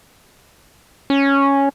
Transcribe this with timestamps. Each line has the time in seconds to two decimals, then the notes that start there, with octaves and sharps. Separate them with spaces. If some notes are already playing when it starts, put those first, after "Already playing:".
1.10 C#4